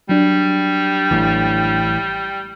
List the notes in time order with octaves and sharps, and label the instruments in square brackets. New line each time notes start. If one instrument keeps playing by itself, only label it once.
[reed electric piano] F#3 D4 [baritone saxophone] G3
[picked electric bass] A1 A2 E3